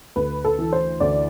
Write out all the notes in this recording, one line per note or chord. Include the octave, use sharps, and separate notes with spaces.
D2 B4
A4
E3
C5
D2 D5